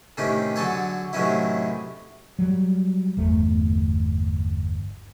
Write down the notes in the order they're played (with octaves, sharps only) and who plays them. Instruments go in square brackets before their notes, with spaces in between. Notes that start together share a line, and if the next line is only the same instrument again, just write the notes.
[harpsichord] A2 C3 D#3 C#4 G4
D3 F#3 G#4 A4 C#5
A2 C3 D#3 F#3 C#4 E4
[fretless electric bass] F#3 G3
G1 E2 A3